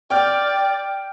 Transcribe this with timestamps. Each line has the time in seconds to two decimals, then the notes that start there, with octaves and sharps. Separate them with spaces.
0.10 D5 G5 F6 G6